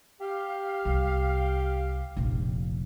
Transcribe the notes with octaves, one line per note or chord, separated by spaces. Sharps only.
G4 F5
C2
F1 A#1